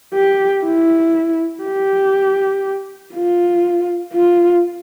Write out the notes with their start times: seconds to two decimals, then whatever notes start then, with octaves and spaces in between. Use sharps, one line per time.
0.14 G4
0.64 E4
1.64 G4
3.14 F4
4.13 F4